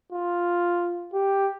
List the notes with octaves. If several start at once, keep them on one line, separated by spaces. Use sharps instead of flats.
F4
G4